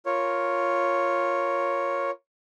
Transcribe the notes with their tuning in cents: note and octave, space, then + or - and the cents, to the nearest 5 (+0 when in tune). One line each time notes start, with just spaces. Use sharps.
F4 +0 A#4 +0 C#5 +0